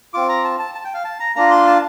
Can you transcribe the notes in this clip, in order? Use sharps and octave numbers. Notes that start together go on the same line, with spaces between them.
C4 F4 D6
A#5
A5
A5
A5
G5
F5
A5
A#5
A#3 D4 F4 A#5
C6
A5